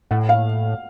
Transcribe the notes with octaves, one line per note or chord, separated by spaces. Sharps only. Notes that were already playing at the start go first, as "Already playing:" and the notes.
A2 F#5
F5